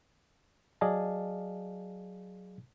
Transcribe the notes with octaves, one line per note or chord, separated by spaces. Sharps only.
F#3 G#4 D5 D#5 F5 A5